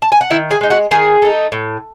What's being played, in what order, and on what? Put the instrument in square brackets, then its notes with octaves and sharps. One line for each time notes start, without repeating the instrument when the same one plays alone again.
[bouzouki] A5
G#5
F#5
D#3 E4 E5
G#4 G#5
G#3 D#4
F#4 F#5
D#3 G#4 G#5
A3 D#4
A2